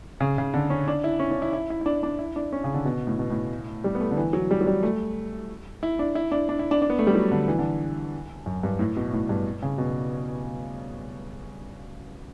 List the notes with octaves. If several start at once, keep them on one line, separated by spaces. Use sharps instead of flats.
C#3
C#3
D3
C#4
D4
E4
C#4
C#4
E4
E4
E4
E4
D4
D4
E4
D4
C#4
C#3
D3
B2
A2
B2
A2
G3
B3
A3
D3
E3
F#3
G3
F#3
G3
A3
E4
D4
E4
D4
D4
E4
D4
D4
B3
A3
G3
F#3
D3
E3
D3
F#2
G2
A2
B2
A2
G2
C#3
B2